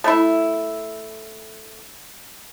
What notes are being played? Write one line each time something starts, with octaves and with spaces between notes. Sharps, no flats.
A3 E4